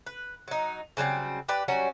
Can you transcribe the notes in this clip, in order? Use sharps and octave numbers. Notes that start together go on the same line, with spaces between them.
B4
F#3 D#4
C#3 F#3 G3 C4
D4 G4 B4
F#3 G3 C#4 F#4